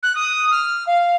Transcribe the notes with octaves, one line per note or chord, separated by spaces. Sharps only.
F#6
D#6
F6
F5